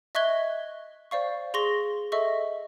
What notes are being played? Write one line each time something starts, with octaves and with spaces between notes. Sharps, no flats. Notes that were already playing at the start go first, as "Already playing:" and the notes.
D#5 E5 C#6 F#6 G#6 G7
C5 D5 F5 C#6
G#4 C6 C#6 A#6 G7
A4 D#5 E5 C#6